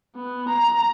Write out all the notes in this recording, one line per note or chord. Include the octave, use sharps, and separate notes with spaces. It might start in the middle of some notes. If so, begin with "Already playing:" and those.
B3
A#5